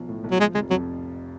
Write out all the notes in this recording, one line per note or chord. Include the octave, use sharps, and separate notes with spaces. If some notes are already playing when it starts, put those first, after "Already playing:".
Already playing: B1 F3
A2
B1
F#3
F3 G#3
F1 G#3
F2 F#3